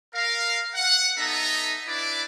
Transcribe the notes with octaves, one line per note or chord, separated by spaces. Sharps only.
A#4 F5
F#5
B3 D#4 A4 D#5 E5 A#5
D4 E4 B4 D5 D6